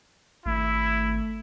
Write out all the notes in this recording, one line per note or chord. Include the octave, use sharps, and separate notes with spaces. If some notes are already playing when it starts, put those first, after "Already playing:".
G#1 A3 E4